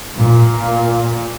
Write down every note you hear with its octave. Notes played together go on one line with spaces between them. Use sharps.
A#2